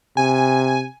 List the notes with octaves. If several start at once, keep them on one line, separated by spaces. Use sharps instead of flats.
C3 G#5